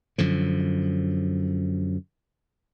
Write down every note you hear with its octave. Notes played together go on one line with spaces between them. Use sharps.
F#2 D3 F3